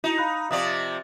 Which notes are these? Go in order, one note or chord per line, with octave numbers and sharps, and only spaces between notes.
D#4 E4 F#4 E7
F5 B5 F#6
C3 F3 D5 F5 D#6
A6